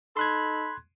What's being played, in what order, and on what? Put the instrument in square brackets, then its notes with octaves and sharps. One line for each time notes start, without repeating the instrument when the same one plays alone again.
[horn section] D#4 A4 B5 [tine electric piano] C6 F#6 G#6